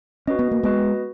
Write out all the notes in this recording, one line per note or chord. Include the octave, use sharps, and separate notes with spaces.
C#4 F#4 B4 D#5
B3
A#3
G#3 B3 F#4 B4 D#5